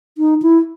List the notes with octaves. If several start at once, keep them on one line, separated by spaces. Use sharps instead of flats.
D#4
E4